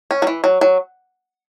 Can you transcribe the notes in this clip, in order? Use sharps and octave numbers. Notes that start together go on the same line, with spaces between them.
C#4
F#3
E3
F#3
F#3